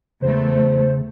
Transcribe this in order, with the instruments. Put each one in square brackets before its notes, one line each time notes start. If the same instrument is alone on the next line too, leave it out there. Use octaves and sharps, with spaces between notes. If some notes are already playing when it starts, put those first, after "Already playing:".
[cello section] E2 A3 [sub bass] C#3 [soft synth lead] C5